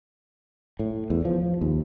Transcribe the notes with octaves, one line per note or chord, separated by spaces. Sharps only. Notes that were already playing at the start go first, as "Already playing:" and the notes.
A2
E2
F3
D#2